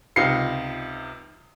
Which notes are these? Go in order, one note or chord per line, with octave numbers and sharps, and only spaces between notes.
C#2 C3 D#4 F4 C7 C#7